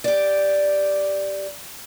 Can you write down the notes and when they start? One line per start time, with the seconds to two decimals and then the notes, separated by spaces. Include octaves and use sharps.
0.04 G4 D5